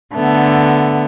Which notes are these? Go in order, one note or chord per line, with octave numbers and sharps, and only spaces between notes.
D3 A3 B3